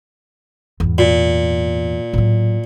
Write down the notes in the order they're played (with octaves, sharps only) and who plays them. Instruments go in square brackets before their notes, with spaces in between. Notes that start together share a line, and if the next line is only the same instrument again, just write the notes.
[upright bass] E2 G#2
[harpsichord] A#2
[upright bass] A2 F#3